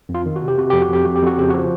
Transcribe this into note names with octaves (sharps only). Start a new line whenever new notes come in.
F2
F4
D#3
F#4
C3
G4
C3 F#4
F2 G4
F#4
F2 G4
F2 F#4
G4
F2 F#4
C#3 G4
F3 F#4